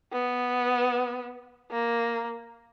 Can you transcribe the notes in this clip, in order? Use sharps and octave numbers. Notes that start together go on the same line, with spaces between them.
B3
A#3